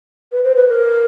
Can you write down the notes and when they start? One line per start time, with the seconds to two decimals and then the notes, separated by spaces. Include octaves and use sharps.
0.32 B4
0.44 C5
0.56 B4
0.68 A#4